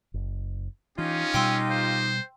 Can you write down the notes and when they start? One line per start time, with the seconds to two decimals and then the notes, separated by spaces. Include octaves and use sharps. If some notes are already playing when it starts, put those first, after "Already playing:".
0.14 F#1
0.98 E3 C#4 D#4 F4 G4
1.34 B2 G3 G5 C6 E6
1.70 C5